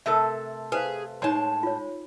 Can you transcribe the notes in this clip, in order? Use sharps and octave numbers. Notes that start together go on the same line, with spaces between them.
C3 A3 A4 A#4 E5
G#4 B4 C5 F5
A2 G#3 D#4 C#5 A5 C6
F4 C#5